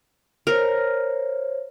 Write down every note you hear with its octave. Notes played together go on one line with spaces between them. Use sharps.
A#4 C5 C#5